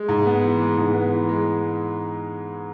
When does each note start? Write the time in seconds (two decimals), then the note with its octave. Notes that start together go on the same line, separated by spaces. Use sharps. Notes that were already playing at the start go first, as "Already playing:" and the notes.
Already playing: G#3
0.08 G#2
0.26 B3
0.42 E3
0.60 G#3
0.77 G#2
0.94 B3
1.11 E3
1.29 G#3